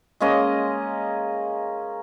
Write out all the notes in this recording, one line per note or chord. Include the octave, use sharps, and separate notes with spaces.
G#3 A#3 C#4 D#5